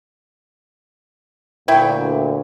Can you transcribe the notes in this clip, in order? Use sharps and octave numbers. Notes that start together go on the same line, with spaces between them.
D2 A#2 F#3 E4 G5